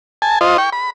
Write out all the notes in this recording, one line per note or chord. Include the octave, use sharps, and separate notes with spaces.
G#5 A5
F4 C5 D#5
G5 C#6
B5